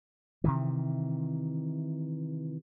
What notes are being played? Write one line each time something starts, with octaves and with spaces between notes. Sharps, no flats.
C3 D#3 E3